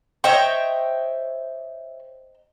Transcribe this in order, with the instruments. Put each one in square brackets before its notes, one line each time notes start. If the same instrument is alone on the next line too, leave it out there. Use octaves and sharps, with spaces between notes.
[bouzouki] C5 D#5 G5 [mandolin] C#5 E5 C#6